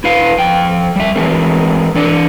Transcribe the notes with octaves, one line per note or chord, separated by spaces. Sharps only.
E4 B4 F5
F2 G5
G3 E5
E3 G#3 C4 A#4
E3 D4 D5 G#5 A5